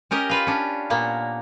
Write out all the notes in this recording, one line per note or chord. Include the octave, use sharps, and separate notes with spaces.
C#4 G4 A#4 D#5
F4 B4 F5
C#4 D4
A#2 A#3 B3